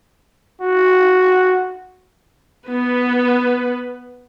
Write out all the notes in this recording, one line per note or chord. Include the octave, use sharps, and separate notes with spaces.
F#4
B3 B4